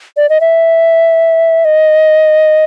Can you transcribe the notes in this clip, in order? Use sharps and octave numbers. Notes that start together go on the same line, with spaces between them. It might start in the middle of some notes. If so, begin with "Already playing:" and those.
D5
D#5
E5
D#5